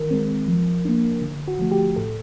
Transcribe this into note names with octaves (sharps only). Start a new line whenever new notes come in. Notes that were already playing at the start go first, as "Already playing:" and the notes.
Already playing: D#3 A#4
G#3 C4
F3
A#3 D4
D3
F#4
F3 A3
G4
A2 A4